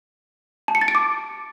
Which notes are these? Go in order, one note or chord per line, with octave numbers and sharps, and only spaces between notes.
A5
C#7
A6
D7
D6